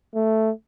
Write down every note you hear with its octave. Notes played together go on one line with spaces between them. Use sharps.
A3